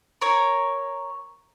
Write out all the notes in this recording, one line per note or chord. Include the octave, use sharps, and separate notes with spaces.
A#4 C#5